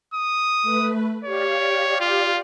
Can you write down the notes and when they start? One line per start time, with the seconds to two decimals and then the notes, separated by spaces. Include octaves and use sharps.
0.14 D#6
0.62 A3 B4
1.25 G4 C#5 D5 F5
2.01 F4